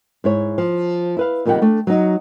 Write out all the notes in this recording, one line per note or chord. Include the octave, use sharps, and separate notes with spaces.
G#2 E4 C#5
F3
E4 B4 F5
F2 A#2 D#3 G3 F#5 G5
A3 D4
F#3 D#4